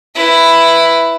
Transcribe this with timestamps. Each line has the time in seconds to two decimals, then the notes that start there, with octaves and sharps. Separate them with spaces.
0.15 E4 B4